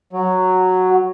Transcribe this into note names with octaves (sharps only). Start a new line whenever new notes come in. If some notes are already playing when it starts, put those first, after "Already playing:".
F#3